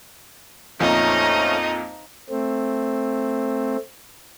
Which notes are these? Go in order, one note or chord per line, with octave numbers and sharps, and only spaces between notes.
F2 A#2 F3 A3 C#4 D#4 D#5 A#5
A3 C4